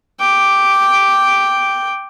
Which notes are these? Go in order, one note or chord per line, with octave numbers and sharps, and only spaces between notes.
G5 D6